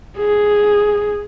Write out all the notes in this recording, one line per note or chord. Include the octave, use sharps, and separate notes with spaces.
G#4